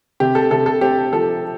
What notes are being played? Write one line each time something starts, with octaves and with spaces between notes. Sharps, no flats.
C3 G4
A4
C3 A4
A4
C4 G4
F3 A4